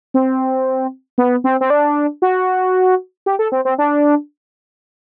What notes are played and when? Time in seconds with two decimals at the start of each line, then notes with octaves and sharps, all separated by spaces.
0.14 C4
1.18 B3
1.44 C4
1.61 C4
1.70 D4
2.22 F#4
3.26 G4
3.39 A4
3.52 C4
3.65 C4
3.78 D4